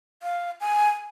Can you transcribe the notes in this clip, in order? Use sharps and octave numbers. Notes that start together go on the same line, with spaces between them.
F5
G#5